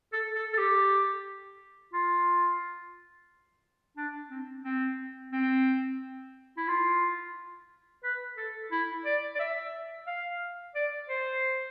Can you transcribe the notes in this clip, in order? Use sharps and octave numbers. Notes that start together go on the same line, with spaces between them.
A4
A4
A4
G4
F4
D4
C4
C4
C4
E4
F4
B4
A4
E4
D5
D5
E5
F5
D5
C5